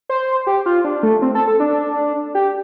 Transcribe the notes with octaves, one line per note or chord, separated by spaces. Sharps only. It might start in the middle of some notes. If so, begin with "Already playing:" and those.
C5
G4
F4
D4
A3
C4
A4
A4
D4
G4